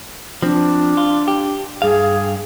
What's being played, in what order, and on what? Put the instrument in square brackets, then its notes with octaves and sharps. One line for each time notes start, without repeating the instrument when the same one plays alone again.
[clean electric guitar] F3 C4 [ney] D4
[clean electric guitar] F4
G4
[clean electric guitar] G2 F5 [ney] G#4